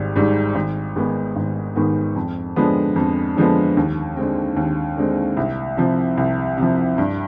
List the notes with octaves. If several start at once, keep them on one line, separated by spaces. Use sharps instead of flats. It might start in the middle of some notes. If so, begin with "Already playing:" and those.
Already playing: G#1 G#2 G3
G#2 G3
G#1
G#2 D#3 G#3 B3
G#1
G#2 D#3 G#3 B3
F2
D3 F3 G#3 B3
F2
D3 F3 G#3 B3
D#2
D3 G#3 C4
D#2
D3 G#3 C4
C2
C3 F3
C2
C3 F3
G2